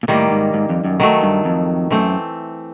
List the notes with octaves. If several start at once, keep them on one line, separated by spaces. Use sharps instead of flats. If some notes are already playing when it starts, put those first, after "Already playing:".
A#2
A2 D#3 G3 A#3
G#2
G#2
F2
F#2
D#3 F#3 A3
G2
F2
F#2 E3 A3 C4